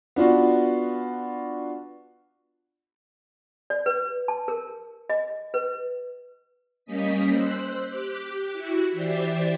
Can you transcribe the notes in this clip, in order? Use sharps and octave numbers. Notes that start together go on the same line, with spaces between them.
B3 D4 F4 F#4
D5
B4
A5
A#4
D#5
B4
G3 A#3 C#4 D#5 B6
C5 E6 F#6
G4 D6 F#6
E4 F#4
E3 G4 C5 D5 E5